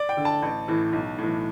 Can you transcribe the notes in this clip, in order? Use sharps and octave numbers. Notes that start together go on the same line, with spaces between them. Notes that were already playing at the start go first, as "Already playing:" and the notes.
Already playing: D5
G5
D3
A5
A1
A2 E3
B1
A2 E3